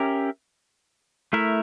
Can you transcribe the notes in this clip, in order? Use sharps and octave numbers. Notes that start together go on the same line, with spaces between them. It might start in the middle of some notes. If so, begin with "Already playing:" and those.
Already playing: C#4 G4 A#4 E5
A3 E4 A#4 E5